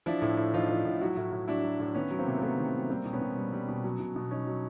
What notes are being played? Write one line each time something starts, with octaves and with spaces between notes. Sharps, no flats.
F3 D4 E4
A2
A2
F3 D#4 F4
F3
A2
F#3 E4 F#4
A2
A2
F#3 D4 E4
F#3
A2
D#3 B3 C#4
F#3
A#3 C4
C3
A#3
C3 A3 B3
D#3
F#3
G3 A#3 C4
B2
B3 C#4
B2
G3
G3
B2
F#3
B2
B2
F#3 C#4 D#4
F#3